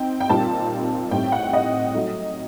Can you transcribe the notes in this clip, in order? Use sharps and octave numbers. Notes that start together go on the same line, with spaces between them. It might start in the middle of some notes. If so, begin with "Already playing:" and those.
Already playing: C4 D#4 G5
G5
A#2 G3 C4 D#4 A5
A2 G3 C4 D#4 G5
F#5
D#5
F#3 A3 D#4